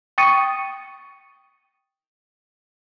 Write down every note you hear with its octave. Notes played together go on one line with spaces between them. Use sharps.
G5 C#6 D#6 A6 C#7 D#7